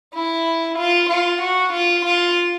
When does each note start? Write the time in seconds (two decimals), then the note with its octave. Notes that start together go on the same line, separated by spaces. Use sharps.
0.15 E4
0.78 F4
1.09 F4
1.41 F#4
1.73 F4
2.05 F4